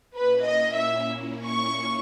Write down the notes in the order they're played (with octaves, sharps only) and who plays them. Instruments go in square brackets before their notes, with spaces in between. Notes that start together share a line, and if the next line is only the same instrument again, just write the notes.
[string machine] A#2 A#3 C#4 E4 [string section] B4
[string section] D#5
E5
C#6